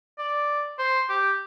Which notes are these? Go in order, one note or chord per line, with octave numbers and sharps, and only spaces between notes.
D5
C5
G4